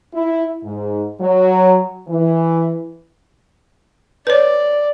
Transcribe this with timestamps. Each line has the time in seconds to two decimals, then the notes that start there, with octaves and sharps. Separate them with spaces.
0.13 E4
0.62 G#2
1.19 F#3
2.08 E3
4.27 B4 C#5 D5